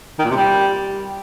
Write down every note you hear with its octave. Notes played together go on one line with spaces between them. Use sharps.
D#3
A#2
C3
G3